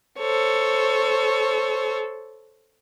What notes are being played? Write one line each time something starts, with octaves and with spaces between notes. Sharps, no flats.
A4 C5 C#5